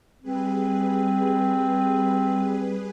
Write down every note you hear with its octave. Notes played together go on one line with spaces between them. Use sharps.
G3 C4 G#4 B4